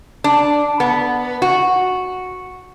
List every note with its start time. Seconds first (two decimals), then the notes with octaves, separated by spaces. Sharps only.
0.24 D4
0.80 B3
1.42 F#4